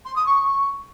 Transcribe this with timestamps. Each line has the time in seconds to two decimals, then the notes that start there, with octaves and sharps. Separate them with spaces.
0.05 C6
0.16 D#6
0.26 C#6